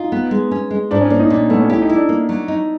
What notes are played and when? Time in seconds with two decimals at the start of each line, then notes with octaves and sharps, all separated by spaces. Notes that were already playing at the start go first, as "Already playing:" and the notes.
Already playing: D#4 F4
0.12 B3
0.31 G#3
0.51 C#4
0.71 G#3
0.91 G#2 D4
1.01 C#4
1.10 A#3 D4
1.20 D#4
1.30 A#2 D4
1.50 A3 B3
1.60 C#4
1.70 E4 G4
1.82 D#4
1.89 E4
1.96 D4
2.09 A#3
2.29 F#3
2.48 D#4